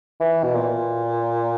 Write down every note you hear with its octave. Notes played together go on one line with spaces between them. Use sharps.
E3
B2
A#2